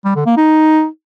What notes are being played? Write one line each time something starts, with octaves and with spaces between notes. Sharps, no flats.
G3
D3
A#3
D#4